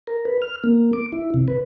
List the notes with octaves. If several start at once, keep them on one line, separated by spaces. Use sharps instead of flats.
A#4
B4
F6
A#3
D6
E4
C3
B4